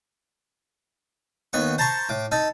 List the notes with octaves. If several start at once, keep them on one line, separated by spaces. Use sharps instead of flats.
D#2 B3 C#6
C5 A5 A#5 C6 C#6
A2 D6
D#4 A4